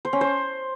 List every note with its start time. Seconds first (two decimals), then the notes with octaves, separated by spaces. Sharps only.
0.05 C5
0.13 C#4
0.21 C5